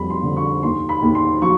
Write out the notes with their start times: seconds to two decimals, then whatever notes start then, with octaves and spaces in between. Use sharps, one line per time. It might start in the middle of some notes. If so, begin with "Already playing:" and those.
Already playing: F2 G3 B5
0.10 C6
0.23 D3
0.37 C#6
0.63 D#2 C6
0.89 B5
1.02 D#2
1.15 C6
1.42 F#3 C#6